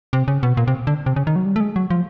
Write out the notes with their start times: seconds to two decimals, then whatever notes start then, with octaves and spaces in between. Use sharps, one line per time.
0.13 C3
0.28 C#3
0.43 B2
0.57 A#2
0.67 C3
0.87 D3
1.06 C3
1.16 C#3
1.27 D#3
1.36 F#3
1.46 G3
1.56 A3
1.60 G#3
1.76 F#3
1.90 F3